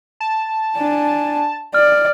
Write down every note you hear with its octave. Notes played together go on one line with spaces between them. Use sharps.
A5
D4 G#5
D5 F6